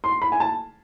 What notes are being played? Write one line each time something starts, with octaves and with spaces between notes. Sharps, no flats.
C6
B5
G#5
A5